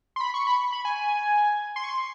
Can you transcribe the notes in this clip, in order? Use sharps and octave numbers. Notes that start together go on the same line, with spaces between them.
C6
B5
C#6
B5
B5
G#5
C6
C#6
C6